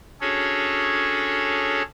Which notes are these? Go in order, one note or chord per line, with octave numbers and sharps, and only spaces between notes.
C#4 D4 F#4 G#4 A4 C#5